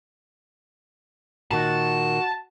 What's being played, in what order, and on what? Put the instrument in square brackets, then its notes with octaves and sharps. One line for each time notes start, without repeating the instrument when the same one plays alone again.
[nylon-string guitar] A#2 D#3 [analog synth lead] F#4 [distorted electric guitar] A5